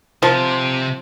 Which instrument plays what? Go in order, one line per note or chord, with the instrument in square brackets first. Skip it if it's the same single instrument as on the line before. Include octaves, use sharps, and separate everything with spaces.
[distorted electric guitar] C3 C5 [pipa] F3